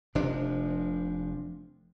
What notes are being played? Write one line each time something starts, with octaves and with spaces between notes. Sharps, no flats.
F1 C3 F3 D4